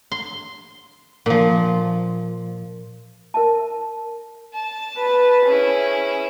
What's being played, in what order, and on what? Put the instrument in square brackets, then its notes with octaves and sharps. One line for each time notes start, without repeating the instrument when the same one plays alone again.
[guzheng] C6
A#2 F3
[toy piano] A#4 E5 A5
[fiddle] A5
[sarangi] B4
[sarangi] C#4 [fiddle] E4 G#4